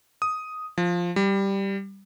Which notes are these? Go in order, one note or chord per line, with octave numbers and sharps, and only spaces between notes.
D#6
F3
G3